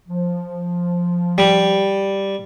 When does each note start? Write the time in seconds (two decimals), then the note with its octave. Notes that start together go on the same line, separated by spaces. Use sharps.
0.08 F3
1.38 G3